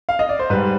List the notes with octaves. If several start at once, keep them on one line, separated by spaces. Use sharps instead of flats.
F5
D#5
D5
C5
G#2 G3 B4